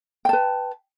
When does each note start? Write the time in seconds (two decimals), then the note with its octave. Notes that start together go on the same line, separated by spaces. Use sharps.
0.25 G5
0.29 A5
0.33 B4